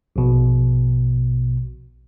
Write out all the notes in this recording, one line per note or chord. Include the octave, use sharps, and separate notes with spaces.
A#1 B2